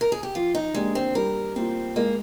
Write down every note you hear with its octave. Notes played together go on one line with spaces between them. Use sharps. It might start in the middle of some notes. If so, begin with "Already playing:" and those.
A#4
G#4
G4
F3 F4
D#4
G#3 A#3 D4 G4
C4
G3 A#4
A#3 C4 F4
G#3 A#3